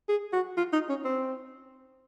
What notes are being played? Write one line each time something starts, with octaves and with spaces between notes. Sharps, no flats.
G#4
F#4
F4
D#4
C#4
C4